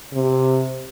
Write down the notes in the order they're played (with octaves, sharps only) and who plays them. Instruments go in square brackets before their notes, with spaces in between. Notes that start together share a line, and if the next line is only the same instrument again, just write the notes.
[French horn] C3